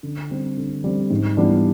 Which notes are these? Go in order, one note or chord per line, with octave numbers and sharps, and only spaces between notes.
D3
G3 C4
D3
G3 C4
G#2
E3 G3 B3 D4